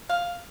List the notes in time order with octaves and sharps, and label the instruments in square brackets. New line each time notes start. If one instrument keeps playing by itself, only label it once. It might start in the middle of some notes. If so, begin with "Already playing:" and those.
[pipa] F5